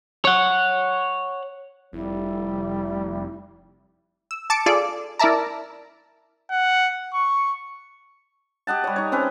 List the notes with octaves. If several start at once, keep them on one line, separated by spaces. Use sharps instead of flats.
C#5 F#5
F1 G3 E4
E6
A5 D6 A6 C#7 D7
F4 G#4 A4 D5
E4 A#4 D5 E5 A5 A#5
F#5
C#6
G4 D#5 F#5 A5
G3 C#5
D#4 C#5
C4 C#4 B4